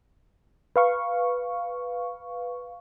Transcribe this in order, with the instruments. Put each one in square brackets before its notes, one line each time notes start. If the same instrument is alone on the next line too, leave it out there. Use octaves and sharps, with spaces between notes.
[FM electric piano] B4 F5 C#6